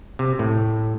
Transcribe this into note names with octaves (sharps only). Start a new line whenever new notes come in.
C3
A2